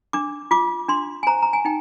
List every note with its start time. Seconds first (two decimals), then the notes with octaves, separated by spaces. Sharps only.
0.13 D4 D6
0.51 F4 D6
0.89 D4 C6
1.23 G#5
1.27 C5 A#5
1.42 A#5
1.53 G#5
1.65 D#4 G5